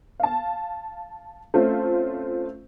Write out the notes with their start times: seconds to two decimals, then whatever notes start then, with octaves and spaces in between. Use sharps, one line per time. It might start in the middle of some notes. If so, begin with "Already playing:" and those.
0.20 F5 A5
1.54 A3 C4 C#4 F4